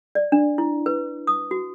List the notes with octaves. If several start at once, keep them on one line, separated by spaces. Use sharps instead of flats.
D5
D4
E4
B4
D#6
F#4